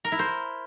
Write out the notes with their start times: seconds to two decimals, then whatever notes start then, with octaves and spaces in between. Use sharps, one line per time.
0.05 A#4
0.12 E4
0.19 C5